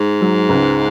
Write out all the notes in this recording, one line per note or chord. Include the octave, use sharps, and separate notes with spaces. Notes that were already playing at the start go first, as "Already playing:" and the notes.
Already playing: G#2
F#3
C#2